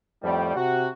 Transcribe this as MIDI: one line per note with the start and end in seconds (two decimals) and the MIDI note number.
0.23 0.55 41
0.23 0.55 45
0.23 0.55 55
0.56 0.88 48
0.56 0.88 66